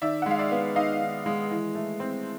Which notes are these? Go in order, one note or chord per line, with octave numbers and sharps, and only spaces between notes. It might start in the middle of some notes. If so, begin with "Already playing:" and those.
D#3 D5 E5
F#5
G#3 F5
D5 E5
B3
D#3 D#5 F5
D#3
G#3
E3
A3
C4